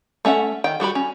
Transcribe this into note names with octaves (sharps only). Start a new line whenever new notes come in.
A3 C#4 E5 F#5
D#3 G5
G3 F#4 G4 B5
C#4